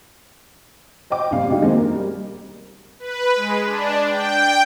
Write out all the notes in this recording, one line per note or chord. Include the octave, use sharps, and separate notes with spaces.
C5 D#5 G5 D6
A#1 G2 C3 F5
C3 G#3 D#4 F#4 G4
D#3 G#3 A#3 C4
A#4
G3
B4
G#3
D4
G5